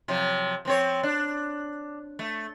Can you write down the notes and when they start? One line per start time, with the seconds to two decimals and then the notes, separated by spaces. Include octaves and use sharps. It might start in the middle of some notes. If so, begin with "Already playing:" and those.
0.08 C3 F3 F#3
0.65 F3 C4 C#5
1.03 D4
2.19 A3